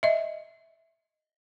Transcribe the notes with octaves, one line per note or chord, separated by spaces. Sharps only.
D#5 E5